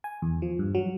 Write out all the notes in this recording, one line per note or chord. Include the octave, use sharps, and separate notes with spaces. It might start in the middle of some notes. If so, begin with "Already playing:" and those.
G#5
E2
F3
G2
F#3